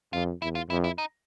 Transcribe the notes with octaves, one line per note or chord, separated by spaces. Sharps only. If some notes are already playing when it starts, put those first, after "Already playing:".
F2 F4
E2 E4
F4
F2 E4
E4
D#4